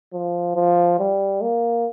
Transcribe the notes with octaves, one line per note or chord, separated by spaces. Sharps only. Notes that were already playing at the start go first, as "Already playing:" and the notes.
F3
F3
G3
A#3